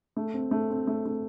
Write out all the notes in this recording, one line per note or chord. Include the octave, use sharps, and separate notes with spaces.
A3
C4
A3
C4
A3
A3